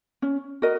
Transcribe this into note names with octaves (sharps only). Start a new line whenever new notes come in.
C#4
F#4 A#4 D#5